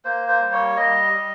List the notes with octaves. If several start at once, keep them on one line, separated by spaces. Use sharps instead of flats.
A#3 C5
C5
G3
C#5
G3 D#5
G3